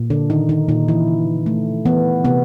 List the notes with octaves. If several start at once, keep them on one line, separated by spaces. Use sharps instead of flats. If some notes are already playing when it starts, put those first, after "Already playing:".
Already playing: A#2
D3 D4
A#2 D#3 D#4
D#3 D#4
A#2 D#3 D#4
E3 E4
C#3
A3
E3 B3
C3 B3